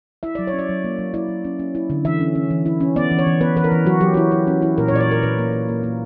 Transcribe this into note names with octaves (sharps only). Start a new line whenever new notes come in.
E4 E5
F#3 D5
C#5
C#4
D5
F#3
A#3
F#3
E4 D5
F#3
C#4
C#4
E4
D3
E3 E5
C#4
C#4
E3
E4
C#4
B3 D5
E3
C#5
E3
B3 B4
E3 B4
A#4
E3
F#3 F#4
F#3 G4
E4 F#4
E4
C#4
E4
A#2 A#4
C#5
A#2 D5
C#5
A#2 A#4
A#2 B4
A#3
A#3
A#3
A#3